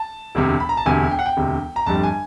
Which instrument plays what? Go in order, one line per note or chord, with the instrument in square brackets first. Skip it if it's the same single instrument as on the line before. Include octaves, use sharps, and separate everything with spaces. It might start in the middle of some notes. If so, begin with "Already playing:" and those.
Already playing: [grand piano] A5
E1 D2 C3
B5
A#5
A5
E1 D2 C3 G#5
G5
F#5
G5
E1 D2 C3
A#5
G1 F2 D3 G3 A5
G#5